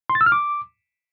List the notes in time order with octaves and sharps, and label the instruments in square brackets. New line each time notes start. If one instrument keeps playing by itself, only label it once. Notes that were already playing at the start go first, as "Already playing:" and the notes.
[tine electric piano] C6
A6
E6
F6
D6